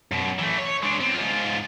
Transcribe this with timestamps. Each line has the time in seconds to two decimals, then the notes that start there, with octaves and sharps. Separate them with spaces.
0.12 F#2 B2
0.39 E3 A3
0.58 C#5
0.82 G#3 D4
1.00 B3 C4
1.14 G#2 F4